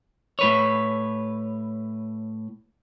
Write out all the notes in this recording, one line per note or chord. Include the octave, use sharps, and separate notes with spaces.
A2 B4 C#5